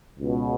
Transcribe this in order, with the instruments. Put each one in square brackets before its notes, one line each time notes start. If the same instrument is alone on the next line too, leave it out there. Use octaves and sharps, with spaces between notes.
[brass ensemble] C#2 B2